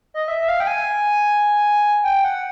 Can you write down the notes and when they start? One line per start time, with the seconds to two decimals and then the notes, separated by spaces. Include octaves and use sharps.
0.14 D#5
0.28 E5
0.42 E5
0.48 F5
0.60 G5
0.67 G#5
2.04 G5
2.24 F#5